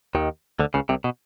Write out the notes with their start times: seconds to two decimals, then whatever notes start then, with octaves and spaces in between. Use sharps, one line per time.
0.15 D#2 D#3
0.59 D2 D3
0.74 C#2 C#3
0.89 C2 C3
1.04 B2